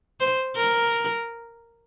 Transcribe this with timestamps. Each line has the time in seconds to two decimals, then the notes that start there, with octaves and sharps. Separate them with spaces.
0.20 C5
0.56 A#4